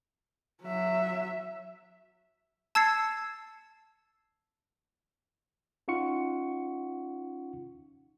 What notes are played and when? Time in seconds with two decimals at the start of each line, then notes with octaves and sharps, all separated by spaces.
0.64 F#3 E5
2.75 A5 E6 G#6 A6 C7 C#7
5.88 C#4 D#4 F4 F#5 C#6 C#7